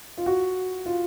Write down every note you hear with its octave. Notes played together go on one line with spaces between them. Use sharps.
F4
F#4
F4